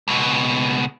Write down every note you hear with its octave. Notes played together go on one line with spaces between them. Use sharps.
C#2 B2